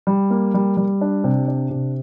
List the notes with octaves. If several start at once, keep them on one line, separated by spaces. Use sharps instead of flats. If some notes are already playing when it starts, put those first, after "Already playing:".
G3
A#3
G3
G3
D4
C3
D4
C3